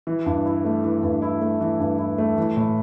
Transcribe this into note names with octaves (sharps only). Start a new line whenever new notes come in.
E3
G2
E4
A3
E3
G2
E4
A3
E3
G2
E4
A3
E3
A2